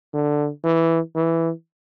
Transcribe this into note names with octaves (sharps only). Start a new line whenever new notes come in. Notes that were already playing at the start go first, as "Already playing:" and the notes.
D3
E3
E3